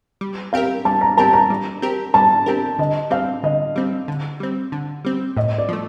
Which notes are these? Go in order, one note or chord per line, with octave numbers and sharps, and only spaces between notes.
G3
C4 G4 A#4 F5
G3 A5
A#5
C4 G4 A#4 A5
A#5
G3
C4 G4 A#4
G3 A5
C4 G4 A#4
D3 D#5
G3 C4 F5
D3 D#5
G3 C4
D3
G3 C4
D3
G3 C4
A2 D#5
D5
F3 A3